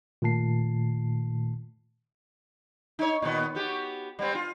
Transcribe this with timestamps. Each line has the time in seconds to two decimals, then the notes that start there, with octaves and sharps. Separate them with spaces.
0.22 A#2 D#3 A3 A5 C7
2.99 D#4 C#5
3.22 A#2 D#3 B3
3.55 B3 F#4 G4
4.19 G3 B3 C4
4.35 F4